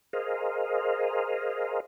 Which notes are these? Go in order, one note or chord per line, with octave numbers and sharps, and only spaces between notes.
G#4 A#4 C5 D#5 F5